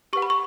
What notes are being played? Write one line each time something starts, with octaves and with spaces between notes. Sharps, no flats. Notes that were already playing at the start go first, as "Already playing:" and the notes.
G4 B4 F#5 C#6
B5
C#6